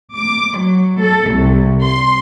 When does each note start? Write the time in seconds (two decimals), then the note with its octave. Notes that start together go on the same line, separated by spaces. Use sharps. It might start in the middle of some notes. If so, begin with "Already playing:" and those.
0.15 D6
0.60 F#3
1.01 A4
1.33 C2
1.84 C6